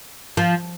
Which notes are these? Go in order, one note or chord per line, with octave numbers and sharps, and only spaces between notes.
F3